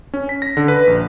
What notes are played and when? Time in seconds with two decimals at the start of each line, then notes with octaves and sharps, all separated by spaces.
0.14 C#4
0.29 B6
0.42 A#6
0.57 D3
0.68 B4
0.87 A#1